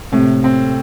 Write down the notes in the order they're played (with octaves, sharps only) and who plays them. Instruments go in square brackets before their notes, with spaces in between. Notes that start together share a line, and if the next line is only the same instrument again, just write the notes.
[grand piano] A2 [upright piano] C3
[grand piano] C4